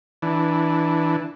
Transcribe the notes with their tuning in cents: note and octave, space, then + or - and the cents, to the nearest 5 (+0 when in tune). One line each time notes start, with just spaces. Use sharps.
E3 -10 D4 +0